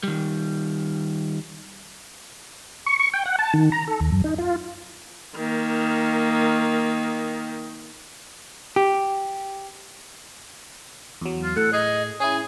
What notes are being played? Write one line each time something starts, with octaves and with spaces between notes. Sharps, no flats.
D#3 G3
C#6
C#6
G5
F#5
A5
D#3
A#5
A4
D#2
F#2
D#4
F4
D#3 A#3
G4
E2 F#3
F4
A2 A4 F#5
G#4 D#5
C#4 E4 G#4 G#5